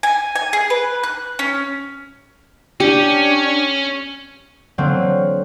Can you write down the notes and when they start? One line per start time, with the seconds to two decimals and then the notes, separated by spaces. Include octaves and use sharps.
0.03 G#5
0.35 G#5
0.53 G#4
0.70 B4
1.03 F#6
1.39 C#4
2.80 C#4 D4 G4
4.78 D3 F#3 A#3 C4